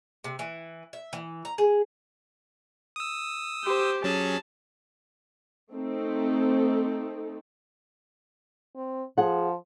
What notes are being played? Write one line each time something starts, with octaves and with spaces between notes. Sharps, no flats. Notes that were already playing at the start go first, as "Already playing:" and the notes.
C3
E3
E5
E3
A#5
G#4
D#6 E6
G4 C5
F#3 C#4 G#4 A5
A3 C4 D#4 A4
C4
F3 G#4 F#5